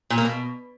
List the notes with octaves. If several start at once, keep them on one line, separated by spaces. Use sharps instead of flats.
A#2
A#3
B2